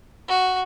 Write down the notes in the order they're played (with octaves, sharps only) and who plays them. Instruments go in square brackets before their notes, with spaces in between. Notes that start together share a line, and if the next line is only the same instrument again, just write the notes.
[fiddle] F#4